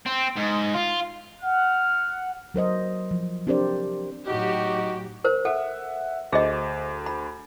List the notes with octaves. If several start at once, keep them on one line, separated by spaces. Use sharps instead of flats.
C4
G#2
F4
F#5 F6
F#3 A#4 C5 D#5
F3
C4 D4 G4 A#4 C5 D5
A2 F#3 D#4 F#4 G4
A#4 C5
A4 E5 F#5
D2 G#4 C5 D#5
B5